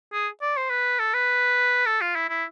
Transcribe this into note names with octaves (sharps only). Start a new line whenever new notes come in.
G#4
D5
C5
B4
A4
B4
A4
F4
E4
E4